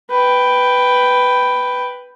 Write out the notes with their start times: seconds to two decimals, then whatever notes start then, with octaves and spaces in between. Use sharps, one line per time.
0.11 B4 G5